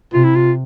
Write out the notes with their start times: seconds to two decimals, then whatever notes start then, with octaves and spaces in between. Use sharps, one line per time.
0.13 C3 F4
0.24 E4
0.35 F4